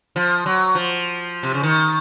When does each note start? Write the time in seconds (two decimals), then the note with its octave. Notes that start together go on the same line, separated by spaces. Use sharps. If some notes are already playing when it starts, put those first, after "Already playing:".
0.16 F3
0.46 F#3
0.75 F3
1.43 C3
1.54 C#3
1.63 D#3